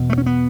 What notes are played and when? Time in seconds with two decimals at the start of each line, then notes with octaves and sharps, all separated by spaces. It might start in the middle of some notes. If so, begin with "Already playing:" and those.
Already playing: E2 B2
0.10 A3
0.18 C#4
0.26 B3